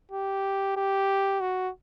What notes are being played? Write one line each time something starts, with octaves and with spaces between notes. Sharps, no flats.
G4
G4
F#4